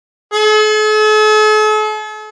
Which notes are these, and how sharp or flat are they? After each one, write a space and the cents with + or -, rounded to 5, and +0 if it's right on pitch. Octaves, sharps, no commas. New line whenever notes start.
A4 -45